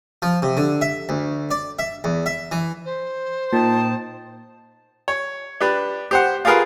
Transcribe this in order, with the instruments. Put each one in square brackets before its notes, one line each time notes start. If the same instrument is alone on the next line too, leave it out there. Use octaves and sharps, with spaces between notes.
[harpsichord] F3
C3
D3
E5
D2
D5
E5
E2
E5
E3
[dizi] C5
[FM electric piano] A#2 [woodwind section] D#4 G5 A5
[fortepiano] C#5
D4 G4 B4
G4 C5 F#5
F4 G4 G#4 A#4 B4 F5